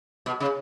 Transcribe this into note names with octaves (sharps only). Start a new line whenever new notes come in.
B2
C#3